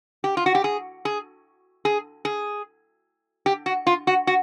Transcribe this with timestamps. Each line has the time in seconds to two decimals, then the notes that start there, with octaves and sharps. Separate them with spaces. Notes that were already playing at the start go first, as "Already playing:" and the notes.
0.24 G4
0.37 F4
0.46 F#4
0.55 G4
0.64 G#4
1.05 G#4
1.85 G#4
2.25 G#4
3.46 G4
3.66 F#4
3.87 F4
4.07 F#4
4.27 F#4